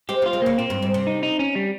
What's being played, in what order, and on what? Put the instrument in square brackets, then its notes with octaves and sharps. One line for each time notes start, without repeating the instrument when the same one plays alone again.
[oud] G#3 C4 [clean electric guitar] G4
[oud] G3 A#3
[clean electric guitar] F4
[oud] G#3 C4
[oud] C#3 [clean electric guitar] A#3
[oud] A#2 [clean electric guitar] C4
[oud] G2
G#2
C3
[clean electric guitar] D#4
D#4
C#4
G3